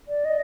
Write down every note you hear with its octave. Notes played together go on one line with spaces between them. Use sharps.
D5
D#5